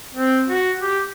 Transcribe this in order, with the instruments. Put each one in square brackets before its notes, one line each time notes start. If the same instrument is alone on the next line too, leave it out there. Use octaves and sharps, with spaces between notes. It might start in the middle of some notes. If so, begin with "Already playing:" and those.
[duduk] C4
F#4
G4